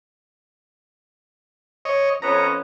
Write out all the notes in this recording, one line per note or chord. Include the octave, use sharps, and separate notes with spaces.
C#5 D#5
F2 B3 C#4 A#5